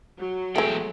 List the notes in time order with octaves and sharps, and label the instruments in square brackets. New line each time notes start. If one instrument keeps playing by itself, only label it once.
[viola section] F#3
[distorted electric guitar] E2 G5 [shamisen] G#3 A3